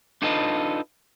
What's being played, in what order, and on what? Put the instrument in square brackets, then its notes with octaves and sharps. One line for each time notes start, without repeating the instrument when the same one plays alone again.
[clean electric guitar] D4 D#4 F4 A4 B4 D#5